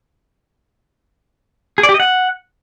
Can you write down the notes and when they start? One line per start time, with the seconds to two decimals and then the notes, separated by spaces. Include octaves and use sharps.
1.78 G#4
1.83 D5
1.89 G4
1.94 D#5
2.00 F#5